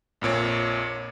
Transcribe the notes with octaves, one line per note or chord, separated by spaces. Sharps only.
A#1 F2 A#2 C#5